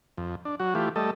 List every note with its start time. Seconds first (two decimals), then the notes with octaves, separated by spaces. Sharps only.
0.18 F2
0.45 D4
0.60 F#3 F#4
0.75 E3 A3 F4 G4
0.96 G3 A3 A4 D#5